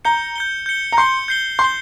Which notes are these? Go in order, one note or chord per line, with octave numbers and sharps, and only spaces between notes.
A#5 G6 C#7 G7
G6 C#7 G7
G6 C#7 G7
A#5
C6 G6 C#7 G7
G6 C7 G7
C6 G6 C7 G7